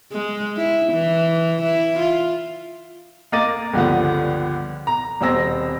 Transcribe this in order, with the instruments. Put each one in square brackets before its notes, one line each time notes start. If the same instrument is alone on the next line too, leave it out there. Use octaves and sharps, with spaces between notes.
[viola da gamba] G#3
E4
E3
E4
F4
[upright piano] A#3 D#5 D6 A6 D#7
C#2 G2 D3 F3 B3
A#5
D#1 B2 C4 E6 A#6